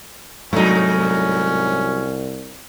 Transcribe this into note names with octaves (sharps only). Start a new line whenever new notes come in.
C2 G#2 F#3 A3 C#4 D#4